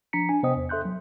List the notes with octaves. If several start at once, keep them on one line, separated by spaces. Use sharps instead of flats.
F3 D4 A#5 B6 C#7
D4 G#5
C3 B3 C5 D#5 G5 D#6
E2
A4 E5 C6 F#6 G6
F#3